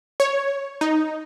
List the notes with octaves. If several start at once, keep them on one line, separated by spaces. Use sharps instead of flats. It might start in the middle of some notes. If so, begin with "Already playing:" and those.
C#5
D#4